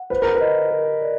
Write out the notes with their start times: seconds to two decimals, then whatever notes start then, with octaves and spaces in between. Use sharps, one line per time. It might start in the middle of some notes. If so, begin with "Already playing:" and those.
Already playing: F#5
0.10 B4 C5
0.22 A#4
0.35 B4
0.41 D#5
0.71 A#4
1.01 D5